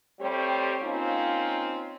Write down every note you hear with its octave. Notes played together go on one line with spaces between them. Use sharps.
G3 A3 C4 G4 C5 C#5
A#3 C4 C#4 D#4 F4